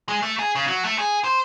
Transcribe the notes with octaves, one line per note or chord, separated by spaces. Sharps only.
G#3
A3
G#4
C#3
F#3
A3
G#4
C5